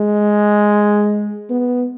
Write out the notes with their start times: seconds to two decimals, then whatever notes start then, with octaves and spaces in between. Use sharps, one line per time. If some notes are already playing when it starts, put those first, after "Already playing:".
Already playing: G#3
1.50 B3